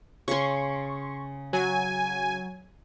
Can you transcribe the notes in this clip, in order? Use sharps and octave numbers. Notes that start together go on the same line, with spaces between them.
C#3 C#4 C6 C#6
F#3 G#5